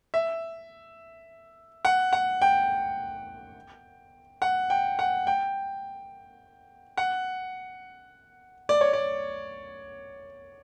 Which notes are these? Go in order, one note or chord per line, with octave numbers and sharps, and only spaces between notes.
E5
F#5
F#5
G5
F#5
G5
F#5
G5
F#5
D5
C#5
D5